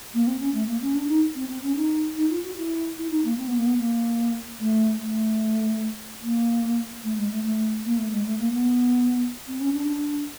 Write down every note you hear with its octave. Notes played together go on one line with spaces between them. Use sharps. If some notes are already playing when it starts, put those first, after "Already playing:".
A#3
C4
C#4
A3
A#3
C#4
D4
D#4
C4
C4
C#4
D#4
D#4
F4
F#4
E4
E4
D#4
A#3
C4
B3
A#3
B3
A#3
A3
A3
A#3
A3
G#3
A3
A3
A#3
A3
G#3
A3
A#3
B3
C4
C#4
D4
D4